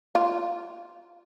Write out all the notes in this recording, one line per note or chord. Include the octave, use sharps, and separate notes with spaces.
F4